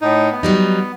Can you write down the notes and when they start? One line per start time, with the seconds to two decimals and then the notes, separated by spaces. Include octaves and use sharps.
0.01 A2 D#4
0.31 B3
0.43 F#3 G3 D#4